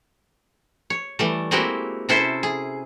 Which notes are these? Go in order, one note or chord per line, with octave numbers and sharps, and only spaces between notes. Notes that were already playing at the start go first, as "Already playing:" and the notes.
C#5
E3 G3 A3
G#3 A#3 C4 E4 F#4 G4
C3 C#4 E4 A4 C5
G#4